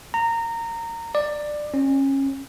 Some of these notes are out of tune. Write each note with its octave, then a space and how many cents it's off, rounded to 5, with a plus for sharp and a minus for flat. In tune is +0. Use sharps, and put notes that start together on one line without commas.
A#5 -20
D5 +15
C#4 -25